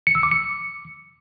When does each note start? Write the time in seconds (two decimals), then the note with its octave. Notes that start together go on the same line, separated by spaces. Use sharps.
0.07 C#7
0.15 E6
0.23 D6
0.31 C#7